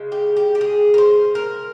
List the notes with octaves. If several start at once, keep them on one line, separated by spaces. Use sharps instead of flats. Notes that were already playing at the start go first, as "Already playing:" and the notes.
Already playing: C#3 G#3
G4
G4
G4
G#4
A#4
C5
A#4